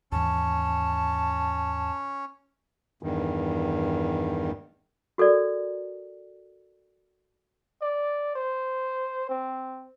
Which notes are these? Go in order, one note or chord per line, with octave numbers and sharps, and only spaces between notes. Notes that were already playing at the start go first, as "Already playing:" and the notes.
D#2 G#2 E3 C#4 A5
E2 G2 D#3
F#4 A4 A#4 D5
D5
C5
C4